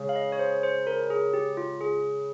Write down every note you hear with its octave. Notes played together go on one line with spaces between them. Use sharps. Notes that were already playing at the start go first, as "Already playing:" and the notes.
Already playing: C#3 G#3
F5
D#5
C#5
C5
C5
A#4
G#4
G4
F4
G#4